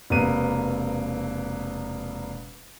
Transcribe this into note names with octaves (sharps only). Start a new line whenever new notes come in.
E1 C3 A#3 B3 D#7